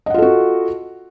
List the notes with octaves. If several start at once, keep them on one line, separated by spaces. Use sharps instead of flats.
F4 F#4 A4 D#5 F#5